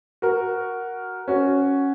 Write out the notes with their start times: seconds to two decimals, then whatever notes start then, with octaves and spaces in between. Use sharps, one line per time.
0.22 F#4 A#4
1.28 C#4 F#4